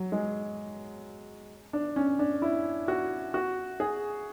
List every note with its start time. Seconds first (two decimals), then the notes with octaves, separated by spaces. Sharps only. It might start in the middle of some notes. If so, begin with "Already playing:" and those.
Already playing: F#3
0.12 G#3
1.73 D4
1.96 C#4
2.19 D4
2.42 E4
2.88 F#4
3.34 F#4
3.80 G#4